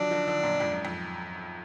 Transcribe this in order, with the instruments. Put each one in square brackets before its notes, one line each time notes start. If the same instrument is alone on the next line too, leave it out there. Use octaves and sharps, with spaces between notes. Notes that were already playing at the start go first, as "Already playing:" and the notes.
Already playing: [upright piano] D3 D#3 F3 F#3 [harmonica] D4
[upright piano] D3 F3
D3 F3
F#2 A#2
F2 G#2
F#2
F2